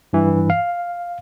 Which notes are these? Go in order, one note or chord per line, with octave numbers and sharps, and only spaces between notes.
G2 E3
F5